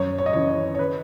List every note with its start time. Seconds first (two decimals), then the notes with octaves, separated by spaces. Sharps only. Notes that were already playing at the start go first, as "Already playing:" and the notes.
Already playing: F#2 C#5
0.18 C#5
0.26 D#5
0.33 C#3 E3 C#5
0.49 C#5
0.75 C#5
0.79 B4